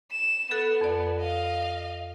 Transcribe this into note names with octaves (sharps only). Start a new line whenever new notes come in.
E7
B3 A4 F#6
F2 D5
D#5 F5